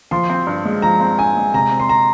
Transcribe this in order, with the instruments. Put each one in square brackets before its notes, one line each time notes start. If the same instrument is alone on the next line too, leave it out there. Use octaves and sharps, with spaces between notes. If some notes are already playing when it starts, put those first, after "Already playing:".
[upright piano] F3 [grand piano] C6
[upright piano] C4
G2
G#3
[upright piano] F3 [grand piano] A#5
[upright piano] C4
[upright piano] G2 [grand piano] G#5
[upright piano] G#3
[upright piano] C3 [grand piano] A#5
[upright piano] C4
[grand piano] C6
A#5